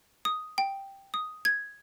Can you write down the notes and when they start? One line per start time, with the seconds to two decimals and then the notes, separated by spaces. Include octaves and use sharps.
0.25 D#6
0.58 G5
1.14 D#6
1.45 G#6